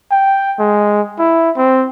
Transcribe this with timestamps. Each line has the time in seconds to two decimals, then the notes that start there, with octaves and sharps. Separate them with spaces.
0.11 G5
0.59 G#3
1.19 E4
1.57 C4